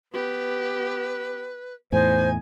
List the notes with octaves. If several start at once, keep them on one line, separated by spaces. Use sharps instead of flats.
B3 G4 B4
E2 A2 D#4 C5 G#5